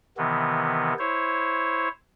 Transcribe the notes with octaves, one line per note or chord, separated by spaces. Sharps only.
C3 D#3 E3 B3
E4 C5 C#5